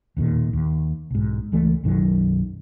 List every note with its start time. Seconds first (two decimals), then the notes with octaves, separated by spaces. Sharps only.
0.17 E1 D#2 A#2 D#3
0.53 D#2
1.11 B1 G#2
1.52 C#2 E3 A3
1.84 B1 F#2 D#3 F#3